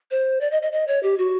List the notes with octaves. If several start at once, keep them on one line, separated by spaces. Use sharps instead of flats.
C5
D5
D#5
D#5
D#5
C#5
G4
F#4